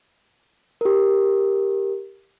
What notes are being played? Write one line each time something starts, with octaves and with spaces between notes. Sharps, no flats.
G4 A#4